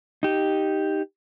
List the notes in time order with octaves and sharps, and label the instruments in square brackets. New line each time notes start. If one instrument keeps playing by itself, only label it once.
[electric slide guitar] D#4 G4